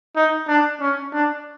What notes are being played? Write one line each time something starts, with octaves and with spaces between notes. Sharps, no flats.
D#4
D4
C#4
D4